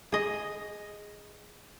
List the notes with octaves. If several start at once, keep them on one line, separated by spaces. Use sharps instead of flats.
G#4 D#5